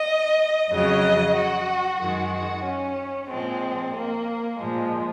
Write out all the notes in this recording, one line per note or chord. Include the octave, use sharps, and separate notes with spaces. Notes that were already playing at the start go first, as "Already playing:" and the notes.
Already playing: D#5
F2 C#3 F#3 D#5
F#4
F#2 D#3 G#3 F#4
F#4
C#4
A#2 F3 G#3 C4
A#3
A#2 F3 G#3